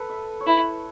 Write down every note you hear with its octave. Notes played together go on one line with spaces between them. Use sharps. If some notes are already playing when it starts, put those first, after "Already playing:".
Already playing: A4 B4
E5
C#5
E4 B4